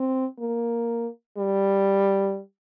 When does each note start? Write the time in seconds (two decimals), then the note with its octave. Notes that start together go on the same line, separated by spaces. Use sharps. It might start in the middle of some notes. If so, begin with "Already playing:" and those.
Already playing: C4
0.39 A#3
1.38 G3